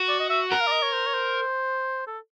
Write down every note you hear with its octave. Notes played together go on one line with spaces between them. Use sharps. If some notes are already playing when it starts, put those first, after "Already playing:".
Already playing: F#4
D5
D#5
E5
A#4 F#5
F5
D5
D#5
C#5
C5
C#5
C5
A4